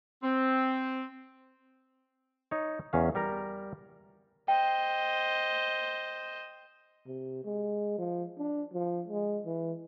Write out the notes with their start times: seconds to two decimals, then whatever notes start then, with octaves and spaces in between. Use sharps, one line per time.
0.23 C4
2.51 D#4 C#5
2.93 E2 C#4 F5
3.15 G3 A#4 A#5
4.48 C5 D#5 G5
7.07 C3
7.45 G#3
7.98 F3
8.38 D4
8.73 F3
9.08 G#3
9.46 E3